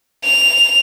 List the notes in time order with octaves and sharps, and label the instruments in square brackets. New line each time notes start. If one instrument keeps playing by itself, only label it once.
[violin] F7